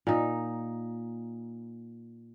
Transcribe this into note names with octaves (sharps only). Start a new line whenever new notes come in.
A#2 D#4